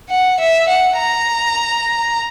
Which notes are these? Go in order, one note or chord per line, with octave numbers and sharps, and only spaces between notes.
F#5
E5
F#5
A#5